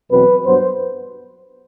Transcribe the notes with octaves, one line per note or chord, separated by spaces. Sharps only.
E2 B2 F#3 C4 B4
G2 F#3 B3 C5